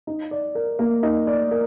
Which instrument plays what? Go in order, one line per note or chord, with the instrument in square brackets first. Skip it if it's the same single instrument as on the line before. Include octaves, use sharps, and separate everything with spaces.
[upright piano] D#4
D5
A#4
A#3
D#4
D5
A#4